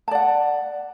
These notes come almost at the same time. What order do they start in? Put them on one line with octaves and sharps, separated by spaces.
A5 D5 F#5